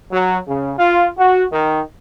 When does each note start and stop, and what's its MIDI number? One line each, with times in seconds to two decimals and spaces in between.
0.11 0.37 54
0.47 0.71 49
0.78 1.08 65
1.18 1.44 66
1.52 1.80 51